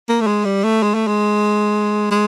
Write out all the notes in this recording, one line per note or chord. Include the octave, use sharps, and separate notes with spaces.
A#3
A3
G#3
G3
A3
G#3
A3
G#3
G#3